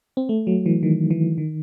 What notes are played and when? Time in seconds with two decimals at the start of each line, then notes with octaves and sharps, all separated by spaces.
0.17 C4
0.29 A3
0.47 F#3
0.66 E3
0.83 D#3
1.10 E3
1.38 D#3